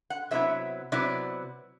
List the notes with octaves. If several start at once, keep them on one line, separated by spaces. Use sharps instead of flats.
F#5
C3 F#3 B3 E4 E5
C3 F#3 B3 E4 D5